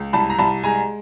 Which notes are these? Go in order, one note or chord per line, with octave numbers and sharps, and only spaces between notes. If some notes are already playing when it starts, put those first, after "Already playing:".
Already playing: C#2
C2 A5 B5
A#5
C2 A5 B5
G#3 G#5 A#5